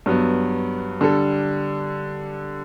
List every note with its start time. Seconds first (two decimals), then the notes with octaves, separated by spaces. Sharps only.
0.06 G2 F#3 B3
1.01 D3 G3 D4 A4